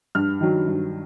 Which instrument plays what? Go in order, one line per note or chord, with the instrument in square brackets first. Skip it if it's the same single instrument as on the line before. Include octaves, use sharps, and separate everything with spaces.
[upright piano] G2 F6
D#3 F#3
G2